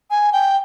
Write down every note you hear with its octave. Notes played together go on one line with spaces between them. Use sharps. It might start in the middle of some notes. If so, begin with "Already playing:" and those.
G#5
G5